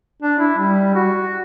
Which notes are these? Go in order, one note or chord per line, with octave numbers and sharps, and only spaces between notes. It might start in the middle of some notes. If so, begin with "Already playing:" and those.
D4
E4
G3
F#4